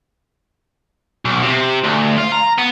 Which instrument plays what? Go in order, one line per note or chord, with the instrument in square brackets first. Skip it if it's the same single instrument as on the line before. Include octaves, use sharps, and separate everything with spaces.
[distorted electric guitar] B1
C3
D2
F4
A#5
B3